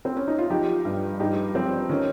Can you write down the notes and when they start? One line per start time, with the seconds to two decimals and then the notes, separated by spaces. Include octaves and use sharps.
0.05 C4
0.17 C#4
0.28 D#4
0.38 F4
0.50 F3 D#4 G4
0.85 G2
1.20 G2 D#4 G4
1.55 F3 C4
1.89 D#3 C#4